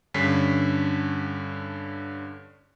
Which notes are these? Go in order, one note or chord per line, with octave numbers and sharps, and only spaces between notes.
G2 D3 C#4 B6 C7